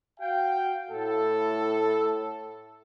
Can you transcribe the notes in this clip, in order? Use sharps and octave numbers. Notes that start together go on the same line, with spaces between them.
F#4 F5 G5
A2 A4